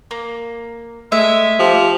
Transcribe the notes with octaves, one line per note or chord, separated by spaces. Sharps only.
A#3
G#3 A3 E5
F3 G4